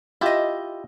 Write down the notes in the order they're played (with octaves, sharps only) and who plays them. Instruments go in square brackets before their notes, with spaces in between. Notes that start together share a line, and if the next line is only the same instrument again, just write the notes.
[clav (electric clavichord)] E4 F4 G4 [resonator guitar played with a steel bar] D#5 E5